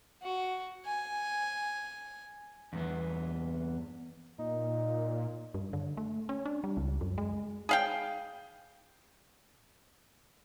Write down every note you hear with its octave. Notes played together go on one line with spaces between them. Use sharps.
F#4
G#5
E2 G2 B3
A#2 D#4
G2
D3
A3
C#4
D4
G3
C#2
F#2
G#3
G#4 F5 G5